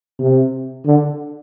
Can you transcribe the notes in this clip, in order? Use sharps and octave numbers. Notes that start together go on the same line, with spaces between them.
C3
D3